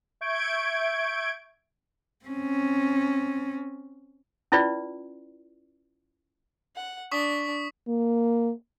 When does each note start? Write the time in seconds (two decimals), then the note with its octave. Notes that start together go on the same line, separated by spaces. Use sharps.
0.21 E5 C#6 G6 G#6 D7
2.25 C4 C#4
4.52 C#4 E4 F4 B4 D5
6.76 F#5
7.12 D4 C#6 D#6 B6
7.88 A#3